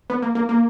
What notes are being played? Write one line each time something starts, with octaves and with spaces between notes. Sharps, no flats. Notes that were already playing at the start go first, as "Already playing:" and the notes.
B3
A#3
A#3
A#3